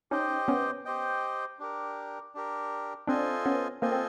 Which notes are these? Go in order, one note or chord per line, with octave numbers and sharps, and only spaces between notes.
C#4 D#4 G4 C5 D#5 G5
B3 C#4
G4 C5 D#5 G5
D4 G4 A#4
D4 G4 A#4
C4 D4 F4 A4 C5 D#5 G#5
B3 C#4
A#3 C4 F4 A4 C5 D#5 G#5
C4